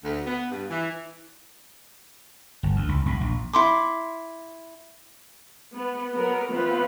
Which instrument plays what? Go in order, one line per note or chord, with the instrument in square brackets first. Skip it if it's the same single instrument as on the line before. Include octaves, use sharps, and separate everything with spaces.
[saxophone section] D2
B3
G2
E3
[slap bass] G1
D2
C#2
B1
A#1
[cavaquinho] E4 C6 D6
[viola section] B3
F#3 B3 A#4
E3 B3 C4 F4 B4